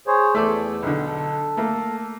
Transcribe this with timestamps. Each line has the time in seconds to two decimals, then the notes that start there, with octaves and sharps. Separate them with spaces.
0.07 G#4 C5 C#5
0.35 E2 A3 A4 D5
0.83 B1 D3
1.07 A4
1.57 A3 A#3